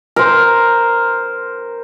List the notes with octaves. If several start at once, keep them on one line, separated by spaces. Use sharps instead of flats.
A#4 C5